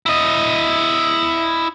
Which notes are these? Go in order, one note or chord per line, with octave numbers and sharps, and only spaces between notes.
E4 D#5